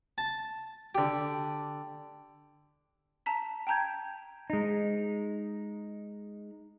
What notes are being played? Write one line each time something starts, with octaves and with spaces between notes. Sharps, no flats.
A5
D3 G4
A5 A#5 B6
G5 A5 A#5 G6 G#6
G#3 D#4